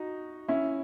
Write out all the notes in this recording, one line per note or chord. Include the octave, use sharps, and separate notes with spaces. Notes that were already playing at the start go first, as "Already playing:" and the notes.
Already playing: D#4 F#4
C#4 E4